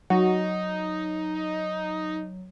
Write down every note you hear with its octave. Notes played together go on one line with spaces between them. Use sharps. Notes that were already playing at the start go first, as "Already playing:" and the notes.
F#3 D#4 F#4